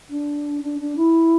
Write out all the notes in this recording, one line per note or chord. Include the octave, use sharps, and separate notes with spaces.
D4
D4
D4
E4